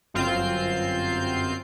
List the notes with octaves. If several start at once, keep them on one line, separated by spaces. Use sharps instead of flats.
G1 F#2 C4 F4 G6 C7